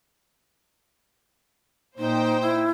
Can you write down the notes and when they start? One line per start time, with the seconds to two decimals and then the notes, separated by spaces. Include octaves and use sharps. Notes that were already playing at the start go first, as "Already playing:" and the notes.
1.99 A#2 D#4 C5 G5
2.41 E4